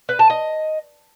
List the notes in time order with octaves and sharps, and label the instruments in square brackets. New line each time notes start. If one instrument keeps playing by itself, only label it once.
[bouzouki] B4
A5
D#5